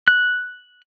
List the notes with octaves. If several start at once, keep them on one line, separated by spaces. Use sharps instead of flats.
F#6